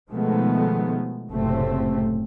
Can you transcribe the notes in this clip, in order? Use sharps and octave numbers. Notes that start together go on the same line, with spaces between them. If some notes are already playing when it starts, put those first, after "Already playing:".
B2 D#3 F3 G#3 A3 B3
F#1 A2 C3 A3 C4